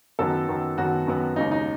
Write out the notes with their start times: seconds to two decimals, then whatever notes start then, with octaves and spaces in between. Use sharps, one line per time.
0.19 F#2 D#3 F#3 B3 A4
0.48 F#2 D#3 F#3 B3
0.77 F#2 D#3 F#3 B3 F#4
1.07 F#2 D#3 F#3 B3
1.36 D#2 C#3 G#3 D#4
1.51 D#4